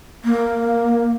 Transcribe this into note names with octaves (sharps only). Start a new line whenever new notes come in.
A#3